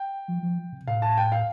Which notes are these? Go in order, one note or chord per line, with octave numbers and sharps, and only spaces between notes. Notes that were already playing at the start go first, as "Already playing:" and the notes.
Already playing: G5
F3
F3
C3
A2 F5
A5
G5
F5